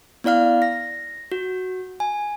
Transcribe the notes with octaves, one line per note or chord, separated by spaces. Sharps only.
B3 E4 D5 F5 F6
A#6
F#4
G#5